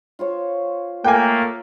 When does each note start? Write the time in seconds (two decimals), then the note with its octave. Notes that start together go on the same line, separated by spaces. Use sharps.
0.19 F4 C5 C#5
1.04 A3 A#3 G5 G#5